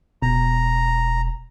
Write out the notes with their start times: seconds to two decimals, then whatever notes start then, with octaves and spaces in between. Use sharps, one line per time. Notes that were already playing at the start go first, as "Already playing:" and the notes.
0.22 E1 B2 A#5